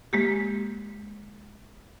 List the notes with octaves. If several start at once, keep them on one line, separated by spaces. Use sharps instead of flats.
G#3 A#3 G4